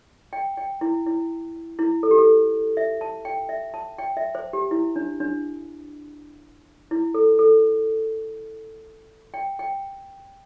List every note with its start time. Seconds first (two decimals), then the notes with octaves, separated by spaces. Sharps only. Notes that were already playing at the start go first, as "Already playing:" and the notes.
0.33 G5
0.57 G5
0.81 E4
1.06 E4
1.79 E4
2.03 A4
2.11 G4
2.18 A4
2.77 E5
3.01 A5
3.25 G5
3.49 E5
3.74 A5
3.98 G5
4.17 E5
4.35 C5
4.53 G4
4.71 E4
4.96 D4
5.20 D4
6.91 E4
7.14 A4
7.39 A4
9.34 G5
9.59 G5